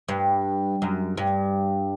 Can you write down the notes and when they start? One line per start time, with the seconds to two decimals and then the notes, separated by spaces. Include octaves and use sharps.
0.09 G2
0.82 F#2
1.17 G2